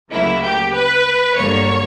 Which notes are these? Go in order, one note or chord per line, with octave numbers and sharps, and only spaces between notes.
D2 C#3 F#3 A#3 E4
G4
B4
G1 G2 D3 F#3 A#3 C#5